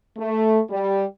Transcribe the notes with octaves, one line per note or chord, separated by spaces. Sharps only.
A3
G3